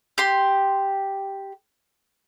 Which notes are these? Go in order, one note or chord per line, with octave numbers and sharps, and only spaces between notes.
G4 C6